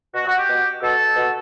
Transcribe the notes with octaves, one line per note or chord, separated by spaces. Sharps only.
B2 F#4
F#4
G4
B2
B2 A4
B2